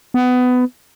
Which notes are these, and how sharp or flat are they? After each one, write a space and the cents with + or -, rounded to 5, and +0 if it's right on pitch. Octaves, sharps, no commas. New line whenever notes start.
B3 +20